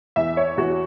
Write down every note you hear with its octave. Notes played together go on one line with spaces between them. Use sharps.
E2 E5
C#5
E2 F#4